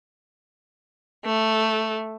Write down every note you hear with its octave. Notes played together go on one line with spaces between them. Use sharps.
A3